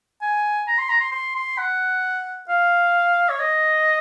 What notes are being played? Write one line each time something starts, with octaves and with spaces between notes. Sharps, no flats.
G#5
A#5
C6
A#5
C6
C6
C6
F#5
F5
C#5
D#5